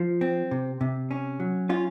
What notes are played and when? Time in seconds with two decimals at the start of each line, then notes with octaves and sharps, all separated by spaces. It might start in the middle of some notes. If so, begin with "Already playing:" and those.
Already playing: F3
0.21 C4
0.51 C3
0.81 C3
1.11 C#4
1.40 F#3
1.69 C#4 F4